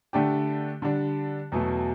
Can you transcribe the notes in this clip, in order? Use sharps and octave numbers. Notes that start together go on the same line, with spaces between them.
D3 A3 D4 G4
D3 G3 D4
E2 B2 F#3 A3